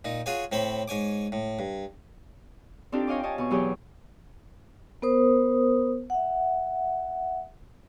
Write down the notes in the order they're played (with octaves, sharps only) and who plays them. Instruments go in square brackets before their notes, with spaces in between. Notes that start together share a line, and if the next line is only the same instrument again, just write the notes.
[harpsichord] A#2 D#4
F4 F#4 G#4 C#5 G#5
A2 C4 C5 C#5 B5
G#2 C#5 G#5 D6
A2
G2
[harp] C4 D4 D#4 F4 G4 A4
C#5 D#5 F5 G5 G#5 D6
C#5 D#5 G#5 A5
B2 G#5 C#6
E2 F#3 G4 G#4 C#5
[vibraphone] B3 A#4 C5 D#6
E5 F#5